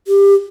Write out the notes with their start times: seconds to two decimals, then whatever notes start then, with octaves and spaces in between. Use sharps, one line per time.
0.07 G4